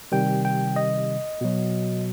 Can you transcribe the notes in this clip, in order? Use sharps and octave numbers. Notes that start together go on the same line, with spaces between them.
C3 D#3 G3 G5
G5
D#5
B2 F#3